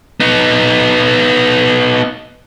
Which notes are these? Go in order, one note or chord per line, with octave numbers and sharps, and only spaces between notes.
B3 D#4